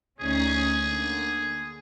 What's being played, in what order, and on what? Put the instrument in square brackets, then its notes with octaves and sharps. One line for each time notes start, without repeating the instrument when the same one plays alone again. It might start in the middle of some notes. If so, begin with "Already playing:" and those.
[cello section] D2 C#4 D#4 [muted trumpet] G#4
[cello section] D3 A#3